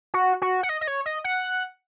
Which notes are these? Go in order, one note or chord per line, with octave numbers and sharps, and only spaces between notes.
F#4
F#4
F#5
D#5
D#5
C#5
D#5
F#5